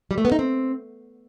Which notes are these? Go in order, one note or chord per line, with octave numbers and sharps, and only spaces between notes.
G3
A3
B3
D#4
C4